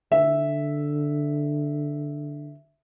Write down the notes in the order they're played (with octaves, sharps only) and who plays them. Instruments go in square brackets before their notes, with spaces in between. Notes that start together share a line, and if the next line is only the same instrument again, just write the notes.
[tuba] D3 [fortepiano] E5